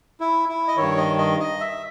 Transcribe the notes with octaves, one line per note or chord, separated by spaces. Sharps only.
E4
E4
D#5
G2 D#3 C#5
D#5
D#5
D#5
E5